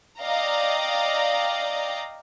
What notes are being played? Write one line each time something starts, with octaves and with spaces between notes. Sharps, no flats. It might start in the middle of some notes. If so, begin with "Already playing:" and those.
D5 D#5 F5 G5 A#5